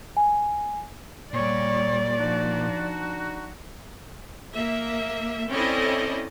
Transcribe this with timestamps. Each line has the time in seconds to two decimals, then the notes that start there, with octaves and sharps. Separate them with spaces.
0.17 G#5
1.33 A#2 G3 C#5 D5
2.19 F3 D4 D#4 F#4
4.56 A#3 E5
5.52 C4 C#4 E4 A4 D5 D#5